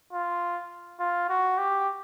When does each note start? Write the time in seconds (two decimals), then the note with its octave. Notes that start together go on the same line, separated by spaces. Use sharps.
0.13 F4
1.00 F4
1.29 F#4
1.58 G4